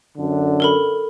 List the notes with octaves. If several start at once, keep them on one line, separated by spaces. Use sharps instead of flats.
F#2 D3
A4 A#4 B5